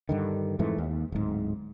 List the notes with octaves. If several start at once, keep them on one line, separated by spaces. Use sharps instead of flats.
G2 D3 D#3
F2 G#2 E3 A3
D#2
D1 G#2